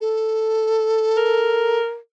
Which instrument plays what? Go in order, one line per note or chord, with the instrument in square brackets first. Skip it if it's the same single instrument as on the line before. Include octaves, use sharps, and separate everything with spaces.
[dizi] A4
[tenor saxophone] A#4